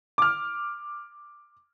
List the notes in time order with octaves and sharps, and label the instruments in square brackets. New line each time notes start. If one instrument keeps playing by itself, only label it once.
[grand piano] D6 F6